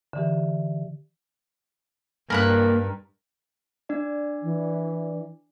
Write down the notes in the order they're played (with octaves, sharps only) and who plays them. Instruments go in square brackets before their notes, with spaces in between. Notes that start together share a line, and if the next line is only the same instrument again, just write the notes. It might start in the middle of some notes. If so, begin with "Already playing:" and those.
[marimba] D3 E3 G4
[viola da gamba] G2 [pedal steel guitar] A#3 [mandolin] A#4 B5 F#6
[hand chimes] D4 D5
[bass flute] E3